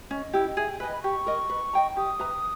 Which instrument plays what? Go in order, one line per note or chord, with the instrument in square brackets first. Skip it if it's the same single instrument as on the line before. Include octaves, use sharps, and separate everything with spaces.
[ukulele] C#4 [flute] D#5
[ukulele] E4 G4
[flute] D#5
[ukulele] G#4 [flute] E5
[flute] G5
[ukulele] B4 D#5 [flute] G#5
[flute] B5
[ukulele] G4 [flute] C#6
[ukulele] A#4 D#5
B4
D#5 G5 A#5
[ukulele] G4 [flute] D#6
[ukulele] B4 E5 A#5